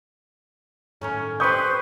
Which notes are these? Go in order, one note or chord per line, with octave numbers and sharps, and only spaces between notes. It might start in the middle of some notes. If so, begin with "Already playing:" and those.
A2 D#3 C#4 A#4
D4 G4 B4 C5 C#6 D#6 G6